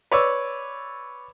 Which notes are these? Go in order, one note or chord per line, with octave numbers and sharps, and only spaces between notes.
B4 C#5 D5 C#6 E6